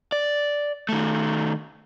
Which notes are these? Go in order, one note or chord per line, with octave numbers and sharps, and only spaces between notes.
D5
D#3 A3